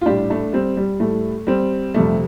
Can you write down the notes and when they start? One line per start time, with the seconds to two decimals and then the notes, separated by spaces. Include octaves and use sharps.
0.01 F4
0.06 A2 G3 D4 G4
0.30 A3 D4
0.53 G3 C4
0.77 G3
1.00 A2 G3 A3
1.47 G3 C4
1.94 F2 C3 G3 A3